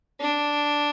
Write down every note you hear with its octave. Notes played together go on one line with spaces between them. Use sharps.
D4